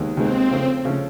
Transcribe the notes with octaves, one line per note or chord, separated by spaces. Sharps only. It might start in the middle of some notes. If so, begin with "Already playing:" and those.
Already playing: D#2 D#3 G#3 B3
D#2 D#3 G#3 B3 C4
C#3 F3 A3
C#3 F3 A3